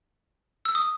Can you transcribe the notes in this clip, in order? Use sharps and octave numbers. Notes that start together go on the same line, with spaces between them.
E6
D#6